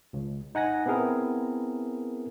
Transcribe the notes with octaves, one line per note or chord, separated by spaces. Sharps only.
C#2
D#4 F#5 G#5 A#6
B3 C4 E4 G#4 A#4